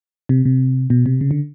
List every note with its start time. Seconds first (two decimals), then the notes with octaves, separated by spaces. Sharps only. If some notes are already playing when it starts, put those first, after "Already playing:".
0.29 C3
0.45 C3
0.90 B2
1.06 C3
1.21 C#3
1.31 D3